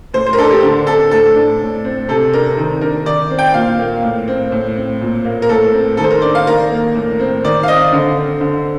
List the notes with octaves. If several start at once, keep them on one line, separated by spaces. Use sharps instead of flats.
A2 C5
C5
A#4
D4 A4
G4
D3
C4 A4
A2 A4
D4
A2
C4
C3 A4
D4 A#4
D#3
D4 A#4
D#3 D5
C4
G5
A#2 F5
A#3
A2
C4
A2
C4
A#2
A#3
A#4
A2 A4
C4
D#3 A4
C5
A#4
D4 D5
F5
D#3 A#4
A#3
A2
C4
D#3 D5
F5
C4 D#5
D3
C4
D3